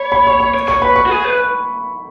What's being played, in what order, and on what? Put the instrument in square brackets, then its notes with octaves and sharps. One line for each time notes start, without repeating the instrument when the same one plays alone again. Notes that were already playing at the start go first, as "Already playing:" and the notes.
Already playing: [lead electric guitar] C#5 [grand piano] B5
[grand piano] B5
C#6
C#6
[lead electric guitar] C#5
[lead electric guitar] C#5 [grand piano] C#6
[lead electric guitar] B4 [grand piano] B5
[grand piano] C#6
[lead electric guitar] F#4
G#4
B4